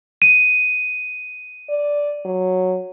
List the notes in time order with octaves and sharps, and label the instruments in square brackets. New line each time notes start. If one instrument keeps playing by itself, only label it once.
[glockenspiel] D#7
[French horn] D5
F#3